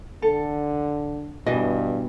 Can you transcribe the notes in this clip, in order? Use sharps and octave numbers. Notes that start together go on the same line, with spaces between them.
D3 A4
G2 B2 E3 D#5